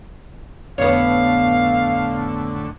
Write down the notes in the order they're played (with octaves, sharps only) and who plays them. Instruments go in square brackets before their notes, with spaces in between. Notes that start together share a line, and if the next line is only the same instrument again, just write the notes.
[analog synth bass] F2 [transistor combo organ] A2 D3 [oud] B3 C#5 [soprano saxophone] F5